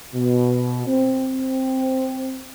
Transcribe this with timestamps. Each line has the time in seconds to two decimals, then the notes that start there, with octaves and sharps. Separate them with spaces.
0.15 B2
0.87 C4